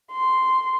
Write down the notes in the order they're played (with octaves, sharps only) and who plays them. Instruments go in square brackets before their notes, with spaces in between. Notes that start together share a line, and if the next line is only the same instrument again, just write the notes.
[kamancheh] C6